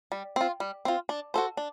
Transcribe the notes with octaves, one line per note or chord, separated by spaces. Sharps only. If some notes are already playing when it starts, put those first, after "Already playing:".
G3
C4 F4
G3
C4 F4
D4
F#4 A4 C5
D4